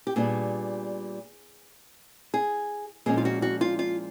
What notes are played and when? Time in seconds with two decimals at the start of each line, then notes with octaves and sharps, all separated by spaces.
0.07 G4
0.16 A#2 G3 B3 D4 G#4
2.34 G#4
3.06 A#2 F3 G#3 C#4 G#4
3.17 F4
3.25 F#4
3.42 F#4
3.61 F4
3.79 F4